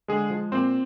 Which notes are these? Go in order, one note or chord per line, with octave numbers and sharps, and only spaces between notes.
D3 G#3 G#4
F3 G#3
A#2 C4 C5